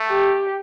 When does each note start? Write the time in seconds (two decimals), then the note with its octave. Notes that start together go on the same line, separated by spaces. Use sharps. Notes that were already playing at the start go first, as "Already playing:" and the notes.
Already playing: A3
0.09 G4